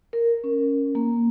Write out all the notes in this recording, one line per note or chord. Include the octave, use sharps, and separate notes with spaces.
A#4
C#4
A#3